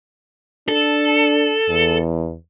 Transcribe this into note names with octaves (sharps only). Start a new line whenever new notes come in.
D4 A4
E2